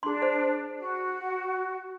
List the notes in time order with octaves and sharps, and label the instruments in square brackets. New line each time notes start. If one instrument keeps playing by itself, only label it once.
[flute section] D4 [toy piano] G#4 C6
[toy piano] C5
[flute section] F#4